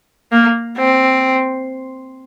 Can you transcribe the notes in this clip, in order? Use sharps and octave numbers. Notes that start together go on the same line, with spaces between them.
A#3
C4